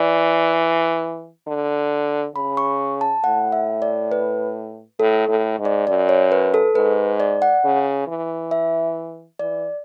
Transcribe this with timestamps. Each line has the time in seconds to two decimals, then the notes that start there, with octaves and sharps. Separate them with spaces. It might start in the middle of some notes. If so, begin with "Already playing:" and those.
Already playing: E3 D5
1.47 D3
2.35 C#3 B5
2.57 C#6
3.01 A5
3.24 A2 F#5
3.52 E5
3.82 D5
4.12 B4
5.00 A2 A4
5.28 A2
5.59 G#2
5.65 D5
5.87 F#2 D5
6.09 C#5
6.32 B4
6.54 A4
6.75 G#2 B4
7.20 D5
7.42 F#5
7.64 C#3
8.07 E3
8.51 E5
9.39 E3 D5